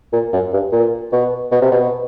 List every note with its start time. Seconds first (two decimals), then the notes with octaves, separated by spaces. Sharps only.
0.13 A#2
0.32 F#2
0.53 G2
0.72 A#2
1.12 B2
1.52 B2
1.62 C3
1.71 B2